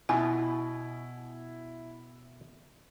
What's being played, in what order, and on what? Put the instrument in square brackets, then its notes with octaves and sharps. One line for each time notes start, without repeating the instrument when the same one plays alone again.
[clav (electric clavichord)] B2 [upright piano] E4 [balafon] G#5